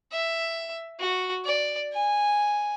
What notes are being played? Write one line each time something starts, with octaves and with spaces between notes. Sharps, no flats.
E5
F#4
D5
G#5